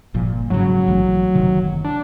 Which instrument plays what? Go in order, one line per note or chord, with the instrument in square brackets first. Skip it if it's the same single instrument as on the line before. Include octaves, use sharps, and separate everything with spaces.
[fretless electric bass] G1 A#2 F3
[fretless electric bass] G#2 C#3 [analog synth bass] F#3
[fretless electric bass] A#1 E3 A3
F#1 C3 D#3
[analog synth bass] D4